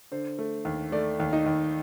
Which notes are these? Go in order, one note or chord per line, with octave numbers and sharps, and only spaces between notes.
D3 C5
A3
D#2
A3 D5
D#2
D#4
D#2